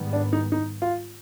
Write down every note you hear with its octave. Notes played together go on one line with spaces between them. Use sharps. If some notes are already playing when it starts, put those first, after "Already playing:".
Already playing: G#2 D#3 G3 B3
D4
D#4
D#4
F4